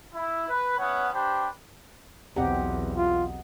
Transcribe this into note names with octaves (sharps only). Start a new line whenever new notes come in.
E4
B4
B3 C#4 E4 C#5 F#5
D4 G4 B4 C5 G5 B5
B1 E2 B2 C4 G4 D#5 F#5 A#5
F4